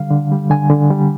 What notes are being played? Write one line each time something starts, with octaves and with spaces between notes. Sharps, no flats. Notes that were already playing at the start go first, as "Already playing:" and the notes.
Already playing: D3 G3 F5
D3
G3
D3 G#5
D3
G3